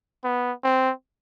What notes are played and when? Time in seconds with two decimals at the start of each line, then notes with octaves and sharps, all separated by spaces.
0.24 B3
0.64 C4